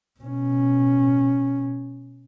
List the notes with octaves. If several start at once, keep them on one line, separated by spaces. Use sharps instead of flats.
B2 C#4